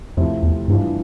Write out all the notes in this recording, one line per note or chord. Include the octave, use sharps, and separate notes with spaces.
F2 C3 F3 A3 E4
E2
G2 E3 G3 D4 F4